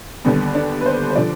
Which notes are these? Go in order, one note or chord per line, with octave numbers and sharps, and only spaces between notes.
D#2 D3 G3 B3
D4
B4
C5
C5
D3 F3 D5